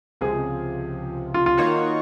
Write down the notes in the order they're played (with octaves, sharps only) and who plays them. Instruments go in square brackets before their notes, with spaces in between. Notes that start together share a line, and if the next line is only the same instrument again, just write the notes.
[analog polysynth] C#2 C3 F3 [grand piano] G#4
[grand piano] F4
F4
[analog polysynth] D#3 A#3 D#4 F#4 C#5